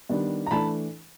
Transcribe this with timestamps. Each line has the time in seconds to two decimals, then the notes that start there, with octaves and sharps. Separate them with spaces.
0.09 D#3 G3 B3 D4
0.46 A#5
0.51 E3 A3 D4 A5 B5